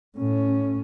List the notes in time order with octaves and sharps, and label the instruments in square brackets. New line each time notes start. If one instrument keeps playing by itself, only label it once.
[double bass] A2 C#4